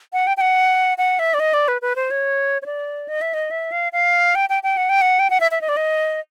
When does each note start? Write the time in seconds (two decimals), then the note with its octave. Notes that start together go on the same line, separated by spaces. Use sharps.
0.13 F#5
0.27 G5
0.37 G5
0.41 F#5
0.98 F#5
1.19 E5
1.34 D5
1.40 D#5
1.54 D5
1.68 B4
1.82 B4
1.96 C5
2.11 C#5
2.62 C#5
2.66 D5
3.08 D#5
3.21 E5
3.34 D#5
3.51 E5
3.72 F5
3.93 F5
4.35 G5
4.49 G5
4.63 G5
4.77 F#5
4.89 G5
5.01 F#5
5.19 G5
5.30 F#5
5.40 E5
5.51 E5
5.61 D#5
5.69 D5
5.77 D#5